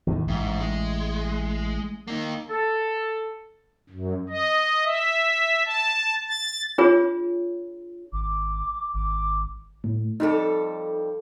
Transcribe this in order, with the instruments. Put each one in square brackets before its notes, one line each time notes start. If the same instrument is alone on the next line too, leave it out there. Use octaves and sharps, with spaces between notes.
[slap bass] E2 A2 D#3
[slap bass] A1 [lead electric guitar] G#2
[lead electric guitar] G#3
A#3 D#4
[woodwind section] A4
[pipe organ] F#2
D#5
E5
A5
A6
[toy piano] D4 F4 G#4 C#5
[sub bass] G#1 [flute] D6
[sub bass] G#1 [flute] D6
[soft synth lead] A2
[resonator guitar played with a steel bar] F2 G3 A4 [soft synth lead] D#4